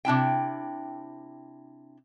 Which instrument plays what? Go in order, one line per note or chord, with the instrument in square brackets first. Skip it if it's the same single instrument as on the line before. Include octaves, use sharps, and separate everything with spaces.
[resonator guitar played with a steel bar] C3 D4 E4 G5